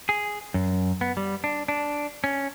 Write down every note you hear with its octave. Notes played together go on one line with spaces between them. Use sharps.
G#4
F#2
B3
G3
D4
D4
C#4